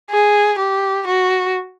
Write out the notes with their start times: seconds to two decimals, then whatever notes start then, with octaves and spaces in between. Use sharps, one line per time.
0.11 G#4
0.59 G4
1.08 F#4